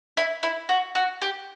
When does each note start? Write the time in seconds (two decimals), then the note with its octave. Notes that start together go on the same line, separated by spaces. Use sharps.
0.17 E4
0.43 E4
0.69 F#4
0.95 F#4
1.22 G4